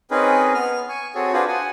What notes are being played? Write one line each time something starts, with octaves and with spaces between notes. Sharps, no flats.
C4 C#4 D#4 G#4 A#4 B4
B3 F6
G#5 C#6
C4 F#4 G#4 A4 C#5
D4 F4 F#4 G#4 B4 C5
F#5 G#5